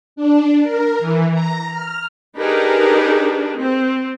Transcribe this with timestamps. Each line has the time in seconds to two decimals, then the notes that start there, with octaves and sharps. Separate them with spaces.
0.16 D4
0.63 A#4
0.99 E3
1.33 A#5
1.72 F6
2.39 D4 D#4 G4 G#4 A#4 B4
3.59 C4